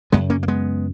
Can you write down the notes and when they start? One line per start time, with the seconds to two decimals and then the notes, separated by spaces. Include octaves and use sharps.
0.12 F#2 C#3 G#3 B3
0.30 A#3 C#4
0.43 A#3
0.48 G#3 B3